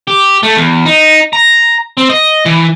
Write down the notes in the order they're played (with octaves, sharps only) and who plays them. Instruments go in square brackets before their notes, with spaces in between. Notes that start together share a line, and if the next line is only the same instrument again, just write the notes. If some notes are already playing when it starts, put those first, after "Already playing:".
[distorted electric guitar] G4
A3
E2
D#4
A#5
C4
D#5
E3